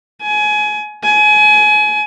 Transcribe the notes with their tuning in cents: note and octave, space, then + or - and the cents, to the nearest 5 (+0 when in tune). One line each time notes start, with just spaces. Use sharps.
G#5 +25
G#5 +30